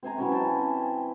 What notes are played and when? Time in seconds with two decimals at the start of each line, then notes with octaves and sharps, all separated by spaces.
0.03 C4 C5 G#5 A#5
0.18 E3 F#3 C#4
0.32 G5 A5
0.59 C4